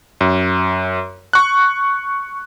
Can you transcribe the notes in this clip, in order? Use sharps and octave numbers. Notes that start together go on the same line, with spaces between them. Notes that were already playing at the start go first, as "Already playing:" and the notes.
F#2
C#6 F#6